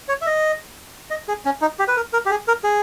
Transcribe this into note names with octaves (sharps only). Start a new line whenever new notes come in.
C#5
E5
D#5
D#5
G#4
C#4
D#4
G4
B4
A#4
A#4
G4
G#4
A#4
G#4